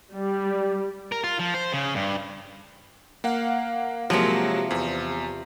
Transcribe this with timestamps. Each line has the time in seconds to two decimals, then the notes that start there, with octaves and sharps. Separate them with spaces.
0.13 G3
1.12 A#4
1.24 F4
1.39 F3
1.54 C5
1.73 C#3
1.95 G2
3.24 A#3 F5 F#5
4.10 C3 F3 F#3 G#3 A#3
4.71 E2